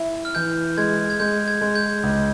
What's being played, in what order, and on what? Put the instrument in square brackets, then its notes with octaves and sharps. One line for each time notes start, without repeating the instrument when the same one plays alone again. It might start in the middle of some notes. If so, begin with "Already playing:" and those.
Already playing: [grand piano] E4
[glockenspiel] F6
[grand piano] E3 [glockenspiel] G6
[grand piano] G#3 [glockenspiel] G#6
[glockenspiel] G#6
[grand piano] G#3 [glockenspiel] G6
[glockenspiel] G#6
[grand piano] G#3
[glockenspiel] G6
[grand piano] C#2